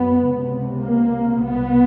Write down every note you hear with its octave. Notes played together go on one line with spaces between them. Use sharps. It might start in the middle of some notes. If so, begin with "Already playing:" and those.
Already playing: F#2 B3
C#2 C3
A#3
C2 B2 B3